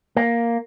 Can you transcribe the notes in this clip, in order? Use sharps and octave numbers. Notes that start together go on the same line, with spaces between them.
A#3